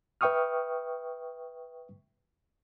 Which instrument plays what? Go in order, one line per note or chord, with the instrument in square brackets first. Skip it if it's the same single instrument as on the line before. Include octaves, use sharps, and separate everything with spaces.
[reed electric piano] B4 E5 G5 C#6 D#6 F6